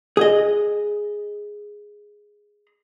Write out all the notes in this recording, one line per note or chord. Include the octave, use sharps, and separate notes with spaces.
G#4 D#5